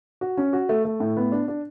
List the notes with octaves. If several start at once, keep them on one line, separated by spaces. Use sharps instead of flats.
F#4
C#4
F#4
A3
A3
A2
B3
D4
D4